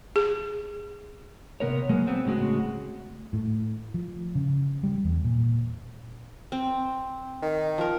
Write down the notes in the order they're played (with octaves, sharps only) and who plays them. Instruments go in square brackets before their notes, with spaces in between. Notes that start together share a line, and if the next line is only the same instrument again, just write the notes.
[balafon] G#4
[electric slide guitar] C3 B3 A#4 C#5
B2 F#3 G#3 A#3
B3 C4
A2 C#3 G#3 F#4
[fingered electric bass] A2
F3
C#3
G3
E2
A#2
[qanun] C4
[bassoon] D#3
[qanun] F3 A#4